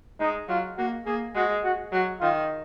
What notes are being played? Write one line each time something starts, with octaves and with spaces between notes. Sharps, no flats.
G#3 D#4
F#3 F4
A#3 F#4
A#3 G#4
G#3 F#4
F#4
F#3 F#4
D#3 F4